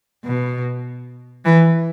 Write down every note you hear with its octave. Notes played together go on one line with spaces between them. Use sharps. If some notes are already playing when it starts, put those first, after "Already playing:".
B2
E3